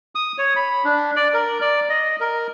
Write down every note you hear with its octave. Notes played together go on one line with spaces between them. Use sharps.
D#6
C#5
B5
D4
D5
A#4
D5
D#5
A#4